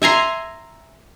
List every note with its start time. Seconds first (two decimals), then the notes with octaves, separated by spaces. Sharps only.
0.02 E5 G#5 A#5 C6